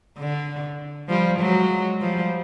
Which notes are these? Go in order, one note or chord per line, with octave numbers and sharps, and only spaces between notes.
D3
F3 G3
F#3 G#3
F3 G3